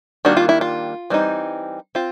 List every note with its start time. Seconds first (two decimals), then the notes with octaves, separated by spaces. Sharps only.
0.25 D#3 G3 A#3 D4 F#4
0.37 F4
0.49 E4
0.61 F4
1.10 E3 G3 C4 D#4
1.95 C4 F4